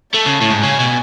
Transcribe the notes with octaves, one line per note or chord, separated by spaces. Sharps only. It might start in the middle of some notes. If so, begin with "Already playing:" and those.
A3 A5
C#3
A2
G#2
C#3 G#5
B2